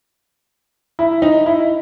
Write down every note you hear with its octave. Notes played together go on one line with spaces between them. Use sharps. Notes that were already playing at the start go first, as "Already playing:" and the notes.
E4
D#4
E4